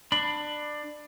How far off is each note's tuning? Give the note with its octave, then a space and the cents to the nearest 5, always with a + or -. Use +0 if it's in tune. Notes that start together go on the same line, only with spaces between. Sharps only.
D4 +20 B5 +0